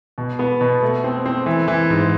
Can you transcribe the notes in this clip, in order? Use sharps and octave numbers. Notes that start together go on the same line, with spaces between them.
B2
B3
B2
A3
C4
C4
E3
E3
G#2